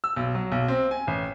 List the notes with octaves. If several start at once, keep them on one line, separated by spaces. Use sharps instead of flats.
E6
B1
F#3
B1
C4
G#5
A1